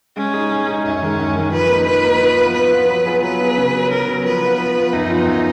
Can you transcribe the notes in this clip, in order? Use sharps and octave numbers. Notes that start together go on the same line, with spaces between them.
G#3 C#4
D#4 G#4
G#3
D#4 G#4
F#2 C#4
D#3 G#3
F#2
D#3 G#3
F3 B4
A#3 D#4
F3 B4
A#3 D#4
F3
B3 F4
F3 B4
B3 F4
F#3
B3 F4 G#4
F#3 B4
B3 F4 G#4
C#3
F#3 B3
C#3 A#4
F#3 B3
F3 B4
B3 F4
F3
B3 F4
F#2 D#4
F3 B3 F4
F#2